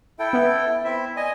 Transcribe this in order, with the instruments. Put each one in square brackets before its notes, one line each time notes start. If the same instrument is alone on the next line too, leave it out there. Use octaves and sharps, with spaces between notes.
[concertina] E4 A4 G5 [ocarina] E5
[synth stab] B3
[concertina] C4 E4 E5
[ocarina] D5 [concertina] D#5 G#5